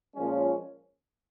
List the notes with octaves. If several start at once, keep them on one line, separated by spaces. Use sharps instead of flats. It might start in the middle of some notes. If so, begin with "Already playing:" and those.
A#2 F3 G#3 C#4